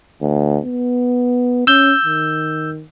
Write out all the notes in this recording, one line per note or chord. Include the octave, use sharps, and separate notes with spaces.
D2
B3
C#4 E6 G6
D#3